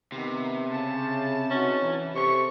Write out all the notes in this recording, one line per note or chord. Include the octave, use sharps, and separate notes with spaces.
C3 D#3 B3
C#3 A5
B2 C#4 D#4 F#4
E3
C3 C4 A4 C#6